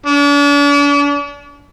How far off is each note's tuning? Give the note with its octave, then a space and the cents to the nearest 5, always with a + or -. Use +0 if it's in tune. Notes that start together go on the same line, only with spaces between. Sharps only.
D4 -40